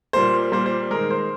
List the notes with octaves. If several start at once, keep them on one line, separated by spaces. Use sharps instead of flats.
A#2 G3 A#3 C5
A#2 G3 A#3 C5
C5
D#3 G#3 A#4
C5